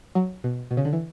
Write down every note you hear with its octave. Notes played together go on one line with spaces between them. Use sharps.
F#3
B2
B2
C#3
D3
E3